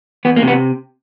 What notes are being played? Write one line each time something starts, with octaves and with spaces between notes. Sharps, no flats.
E2 B3
A#3
C3
B3